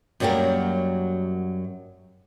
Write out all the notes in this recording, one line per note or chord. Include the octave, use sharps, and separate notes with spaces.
F#2 F#3 G3 A#3 G4 A#4